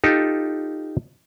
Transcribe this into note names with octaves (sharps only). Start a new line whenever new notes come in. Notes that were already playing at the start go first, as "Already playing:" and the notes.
D#4 F4 G4 A4